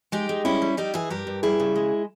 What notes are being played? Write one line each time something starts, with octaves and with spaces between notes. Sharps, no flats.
G#3 D#4 G4
G#3
G3 C#4 E4
G3
G3 D#4 G4
E3 E4 G#4
G2 G4 A#4
G2
G3 E4 G#4
C#3
G#3